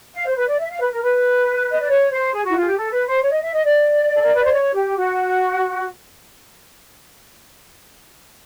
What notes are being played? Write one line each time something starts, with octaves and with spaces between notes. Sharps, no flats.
F5
C5
B4
D5
E5
F5
B4
A#4
B4
D#5
D5
C#5
C5
G#4
F#4
E4
F4
G#4
G4
A4
B4
C5
C#5
D#5
E5
D#5
D5
A4
A#4
B4
C5
C#5
G4
F#4